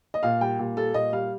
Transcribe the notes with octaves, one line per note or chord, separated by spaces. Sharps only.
D#5
A#2 F5
G3 G5
A#2
G3 A4
A#2 D#5
G3 F5